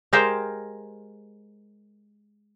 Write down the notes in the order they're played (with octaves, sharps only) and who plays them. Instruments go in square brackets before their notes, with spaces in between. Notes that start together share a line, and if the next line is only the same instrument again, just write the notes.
[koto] G#3 G4 A#4 C5 F5 G5